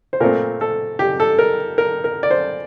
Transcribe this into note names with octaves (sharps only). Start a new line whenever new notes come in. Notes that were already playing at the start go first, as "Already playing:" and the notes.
C5
A#2 A3 C4 A#4
A4
G4
A4
A#4
A#4
A#4
D5
C5